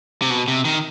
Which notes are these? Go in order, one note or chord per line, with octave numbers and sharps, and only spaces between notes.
C3
B2
C3
D#3